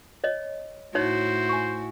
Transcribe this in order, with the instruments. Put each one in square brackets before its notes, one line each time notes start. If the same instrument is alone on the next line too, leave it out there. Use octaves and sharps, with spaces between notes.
[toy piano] C#5 D#5
[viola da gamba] A2 E4 F#4 [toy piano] D#4 C#5 [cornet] C5
[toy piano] G#5 C#6